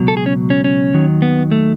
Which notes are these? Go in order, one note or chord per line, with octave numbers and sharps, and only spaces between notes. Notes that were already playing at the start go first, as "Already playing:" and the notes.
Already playing: C#2 B2 F#3
A4
G#4
C#4
C#4
C#4
D#2 D#3 F#3
B3
A3